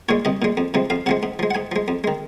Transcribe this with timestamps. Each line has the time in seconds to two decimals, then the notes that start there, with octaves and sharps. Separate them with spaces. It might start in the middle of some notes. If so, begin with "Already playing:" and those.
0.09 A#2 G#3 C#5
0.25 C2 D#5
0.42 A#2 G#3
0.57 F2
0.74 C3 F3 G#3
0.90 F2 F5
1.06 C3 F3 G#3 F#5
1.23 G#2
1.39 F3 G#3
1.51 F#5
1.55 G#2 G#5
1.72 F3 G#3
1.88 F2
2.04 D#3 G#3